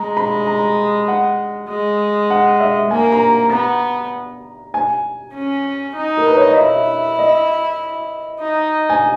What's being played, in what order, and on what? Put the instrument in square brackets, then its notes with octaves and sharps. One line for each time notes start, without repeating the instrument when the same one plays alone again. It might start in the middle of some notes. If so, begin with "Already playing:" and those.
Already playing: [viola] G#3 [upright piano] A#5
[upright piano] B5
A#5
F#5
[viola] G#3
[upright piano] F#5
E5
[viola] A#3 [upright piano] G#5
[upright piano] A#5
[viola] B3 [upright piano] A#5
[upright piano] G#5
[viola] C#4
D#4
[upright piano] A#4
B4
C#5
D#5
[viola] E4 [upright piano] E5
[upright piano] D#5
[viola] D#4
[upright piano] G#5